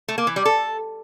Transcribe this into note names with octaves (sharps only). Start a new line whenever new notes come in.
A3
A#3
E3
G3
A4